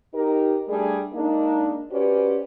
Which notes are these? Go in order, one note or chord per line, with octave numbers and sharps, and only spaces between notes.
D#4 G4 A#4
G3 A3 D4 G#4
G#3 A#3 D4 D#4
C#4 F#4 G4 B4 C5 D5